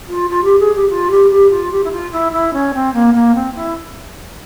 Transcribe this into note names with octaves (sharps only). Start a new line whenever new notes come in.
F4
F4
G4
G#4
G4
F4
G4
G4
F4
G4
E4
F4
E4
E4
C#4
C4
A#3
A#3
C4
E4